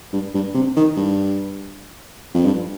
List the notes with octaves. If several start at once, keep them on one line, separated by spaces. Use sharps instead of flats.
G2
G2
C3
D#3
G2
F2
G2